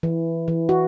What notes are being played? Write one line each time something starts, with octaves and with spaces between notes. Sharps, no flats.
E3
E3
F#4